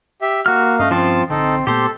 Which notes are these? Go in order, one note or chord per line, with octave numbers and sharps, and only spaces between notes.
G4 E5
A#3 F#4 F6
G2 A3 C#4 D#5 F5
F3 C4 A5
A#1 D3 C4 D#4 A4
A#2 A3 B3 G4 A4 C5